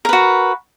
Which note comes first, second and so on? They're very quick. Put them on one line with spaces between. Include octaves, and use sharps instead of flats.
A#4 B4 F#4